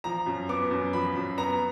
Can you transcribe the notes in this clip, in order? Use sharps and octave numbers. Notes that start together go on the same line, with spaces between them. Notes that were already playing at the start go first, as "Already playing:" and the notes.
F3 A#5
F#2
B3 D6
F#2
F3 B5
F#2
B3 A#5